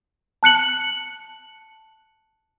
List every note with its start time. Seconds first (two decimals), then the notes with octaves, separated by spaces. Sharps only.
0.43 A5 F#6 C#7 F#7